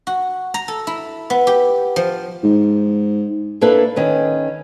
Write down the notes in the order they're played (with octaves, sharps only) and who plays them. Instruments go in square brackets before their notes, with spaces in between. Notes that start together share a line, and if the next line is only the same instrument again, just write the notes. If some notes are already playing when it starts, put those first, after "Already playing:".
[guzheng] F#4
A#5
A4
E4
B3
G4
F3
[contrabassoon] G#2
[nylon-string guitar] A#3 D4 E4 A4 B4
D#3 C#4 B4